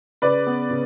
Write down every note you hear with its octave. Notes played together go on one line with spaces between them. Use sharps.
C#3 B4 D5
B3
C#3